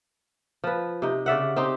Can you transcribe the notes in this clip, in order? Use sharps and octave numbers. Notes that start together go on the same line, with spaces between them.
F3 B4
C3 D#4
C#3 D5 E5 F#5
C4 D#4 G4